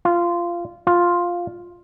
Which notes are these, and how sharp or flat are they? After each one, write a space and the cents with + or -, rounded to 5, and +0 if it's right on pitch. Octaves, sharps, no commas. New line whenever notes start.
F4 -15
F4 +5